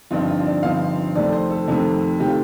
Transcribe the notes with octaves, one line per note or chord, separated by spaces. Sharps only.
G1 G2 F3 C4 D#4 F4
F4
D5
G1 G2 F3 C4 D#4 F5
F2 C3 D#3 A3 C4 D5
C5
A4
F2 C3 D#3 A3 C4
C3 D#3 A3 C4 G4
F4